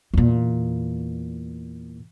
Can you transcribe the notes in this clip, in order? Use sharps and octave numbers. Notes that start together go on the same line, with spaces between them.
E2 A#2